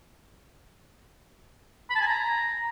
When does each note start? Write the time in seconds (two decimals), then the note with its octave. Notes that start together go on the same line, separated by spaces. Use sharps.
1.90 B5
1.95 A5
2.01 G#5
2.06 A#5